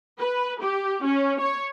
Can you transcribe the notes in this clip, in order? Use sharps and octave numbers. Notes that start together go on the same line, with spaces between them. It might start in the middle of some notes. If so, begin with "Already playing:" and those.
B4
G4
C#4
C#5